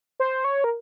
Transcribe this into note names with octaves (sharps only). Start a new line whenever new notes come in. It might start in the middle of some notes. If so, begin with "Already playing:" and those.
C5
C#5
A#4